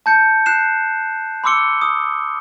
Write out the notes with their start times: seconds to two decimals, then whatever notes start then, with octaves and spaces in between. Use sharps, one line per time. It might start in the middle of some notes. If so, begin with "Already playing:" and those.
0.06 A5 G6 C#7
0.46 F#6 C7 E7
1.44 B5 C6 D6 E6 C#7 G7
1.82 D#6